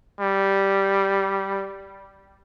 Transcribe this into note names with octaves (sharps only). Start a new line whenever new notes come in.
G3